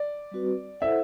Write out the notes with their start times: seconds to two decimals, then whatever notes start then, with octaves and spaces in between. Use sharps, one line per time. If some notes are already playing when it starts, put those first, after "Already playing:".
Already playing: D5
0.31 G3 C4 F#4 B4
0.81 E4 A4 C5 E5 F#5